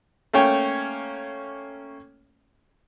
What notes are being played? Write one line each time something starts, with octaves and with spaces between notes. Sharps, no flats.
A3 A#3 C#4 C#5 G5